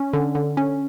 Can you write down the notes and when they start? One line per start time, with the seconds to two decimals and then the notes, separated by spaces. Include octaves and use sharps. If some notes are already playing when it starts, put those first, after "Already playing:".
Already playing: C#4
0.13 D3
0.35 D3
0.57 C#4